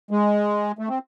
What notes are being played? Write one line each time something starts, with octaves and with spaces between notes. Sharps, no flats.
G#3
A3
C4